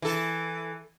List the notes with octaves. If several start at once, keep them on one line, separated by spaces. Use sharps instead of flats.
E3 A4